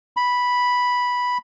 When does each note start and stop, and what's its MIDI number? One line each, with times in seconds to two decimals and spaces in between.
0.17 1.38 83